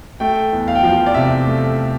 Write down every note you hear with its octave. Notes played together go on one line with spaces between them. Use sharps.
A3 G5
E2
F5
G5
F3 F5
D5
C3 E5
A3